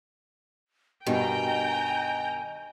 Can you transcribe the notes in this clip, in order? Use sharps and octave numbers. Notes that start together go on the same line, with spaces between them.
G2 B2 D#3 G3 G5 G#5 A#5